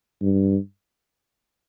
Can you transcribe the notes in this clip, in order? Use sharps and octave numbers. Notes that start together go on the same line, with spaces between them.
G2